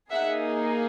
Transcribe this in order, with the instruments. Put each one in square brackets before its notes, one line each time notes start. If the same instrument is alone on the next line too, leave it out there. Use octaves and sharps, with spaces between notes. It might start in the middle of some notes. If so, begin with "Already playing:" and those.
[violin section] A#3 D#4 G#4 E5 F#5